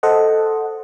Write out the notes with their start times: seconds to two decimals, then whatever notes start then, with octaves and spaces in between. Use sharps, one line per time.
0.03 A4 C5 D#5 F#5